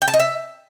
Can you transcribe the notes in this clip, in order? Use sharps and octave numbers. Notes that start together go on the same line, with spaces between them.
G5
A5
D#5
E5